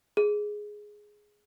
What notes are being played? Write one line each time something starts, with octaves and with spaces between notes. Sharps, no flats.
G#4